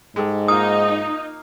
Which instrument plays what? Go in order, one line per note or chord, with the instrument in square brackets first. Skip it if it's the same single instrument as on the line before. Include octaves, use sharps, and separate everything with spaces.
[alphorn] G#2 [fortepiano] G#3 G4 A4
[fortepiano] A#3 F4 [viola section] D#4 [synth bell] D#6